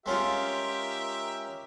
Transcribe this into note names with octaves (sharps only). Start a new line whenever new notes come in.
G#3 C#4 F4 G4 A#4 E5